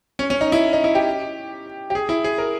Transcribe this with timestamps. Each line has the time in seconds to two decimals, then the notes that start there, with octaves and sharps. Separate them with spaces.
0.19 C#4
0.30 C#4
0.41 D#4
0.52 E4
0.73 D#4
0.84 E4
0.95 G4
1.90 G4
1.95 G#4
2.09 E4
2.24 G#4
2.38 A#4